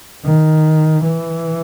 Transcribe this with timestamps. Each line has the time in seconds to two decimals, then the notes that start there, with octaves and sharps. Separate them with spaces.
0.25 D#3
1.04 E3